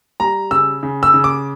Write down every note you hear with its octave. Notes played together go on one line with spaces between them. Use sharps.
G3 A#5
C#3 E6
C#3
E6
C#3
D6